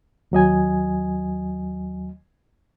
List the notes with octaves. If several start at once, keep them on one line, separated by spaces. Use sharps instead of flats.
D#2 F#3 D#5 G#5